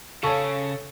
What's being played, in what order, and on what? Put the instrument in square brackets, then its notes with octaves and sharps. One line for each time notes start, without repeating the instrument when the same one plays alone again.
[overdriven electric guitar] C#3 [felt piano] A4 C#5 [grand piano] F5 A5 C#6